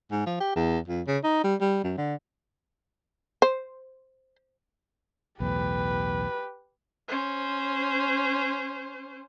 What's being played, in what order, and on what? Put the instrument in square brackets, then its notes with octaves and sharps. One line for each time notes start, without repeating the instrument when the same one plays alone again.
[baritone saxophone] G#2
F3
G4
E2
F2
C#3
D#4
G3
G3
F#2
D3
[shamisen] C5
[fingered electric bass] B1 E2 A2 [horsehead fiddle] G4 B4
[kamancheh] C#4 C5